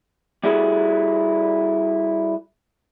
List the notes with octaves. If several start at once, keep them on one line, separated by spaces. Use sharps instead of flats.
G3 E4 F#4 G#4 A4